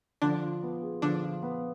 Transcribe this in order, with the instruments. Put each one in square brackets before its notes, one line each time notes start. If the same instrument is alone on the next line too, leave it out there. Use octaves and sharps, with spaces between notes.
[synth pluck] D3 D4 [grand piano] F3
[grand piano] F4
B3
G#4
[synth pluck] D3 D4 [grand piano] F3
[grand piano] F4
B3